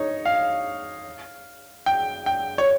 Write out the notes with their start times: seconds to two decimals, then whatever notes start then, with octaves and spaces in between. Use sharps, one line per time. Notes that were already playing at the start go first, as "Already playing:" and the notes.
Already playing: D#4 C#5
0.25 F5
1.86 G5
2.26 G5
2.58 C#5